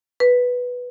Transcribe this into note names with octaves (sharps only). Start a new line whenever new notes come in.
B4